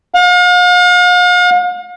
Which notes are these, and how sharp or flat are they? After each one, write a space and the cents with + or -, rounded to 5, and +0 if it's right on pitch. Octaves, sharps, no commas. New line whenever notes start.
F5 +45